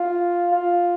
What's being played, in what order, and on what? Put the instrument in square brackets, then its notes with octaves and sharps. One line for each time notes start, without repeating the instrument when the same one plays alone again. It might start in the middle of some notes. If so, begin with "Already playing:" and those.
Already playing: [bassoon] F4
F4